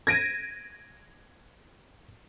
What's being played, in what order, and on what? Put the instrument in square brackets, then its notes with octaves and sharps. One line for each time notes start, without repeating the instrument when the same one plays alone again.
[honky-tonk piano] G#6 A#6 D7 D#7